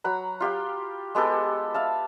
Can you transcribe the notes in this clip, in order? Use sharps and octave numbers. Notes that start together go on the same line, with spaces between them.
F#3 F#5 A#5 B5
F4 G4 F5 G5
G#3 B3 G4 A4
E5 F5 A5